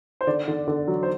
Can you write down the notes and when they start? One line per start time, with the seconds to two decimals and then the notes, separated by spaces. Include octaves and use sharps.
0.21 C5
0.27 D3 D5
0.48 D3
0.68 D3
0.88 F#3
1.03 C5